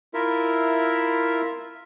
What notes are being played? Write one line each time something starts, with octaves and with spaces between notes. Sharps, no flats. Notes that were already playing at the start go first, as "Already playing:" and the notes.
E4 F4 A#4 E5